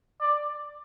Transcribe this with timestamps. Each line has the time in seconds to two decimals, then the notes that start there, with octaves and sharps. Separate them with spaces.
0.21 D5